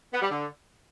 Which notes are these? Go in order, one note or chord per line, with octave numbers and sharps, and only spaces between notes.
B3
G3
D3